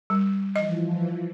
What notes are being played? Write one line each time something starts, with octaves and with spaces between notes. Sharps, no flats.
G3
E3 F3 D#5